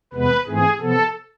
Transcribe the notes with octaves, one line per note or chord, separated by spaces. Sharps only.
E2 C3 G#3 B3 B4
G#2 E3 A3 C4 G#4
C3 F3 B3 A4